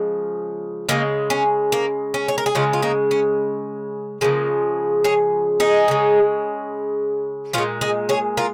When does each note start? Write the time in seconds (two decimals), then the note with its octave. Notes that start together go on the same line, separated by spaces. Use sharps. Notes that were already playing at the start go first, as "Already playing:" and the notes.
Already playing: C#3 F3 G#3
0.89 C#3 F3 G#3 A#3 D#4
1.30 C#4
1.72 A#3
2.14 C#4
2.28 C#5
2.38 A#4
2.46 G#4
2.55 C#3 G#3 C#4 F4
2.73 F4
2.82 A#3 D#4
3.11 C#4
4.21 C#3 F3 G#3 A#3
5.04 G#4 C#5
5.60 D#4 G#4
5.88 C#3 G#3
7.53 A#2 G#3 C#4 F4
7.81 D#4 G#4
8.09 G#4 C#5
8.37 F4 A#4